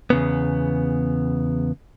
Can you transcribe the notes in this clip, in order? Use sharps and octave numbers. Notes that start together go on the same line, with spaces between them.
E2 C#3 B3